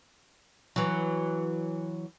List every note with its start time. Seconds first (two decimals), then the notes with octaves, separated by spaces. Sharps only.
0.76 E3 F#3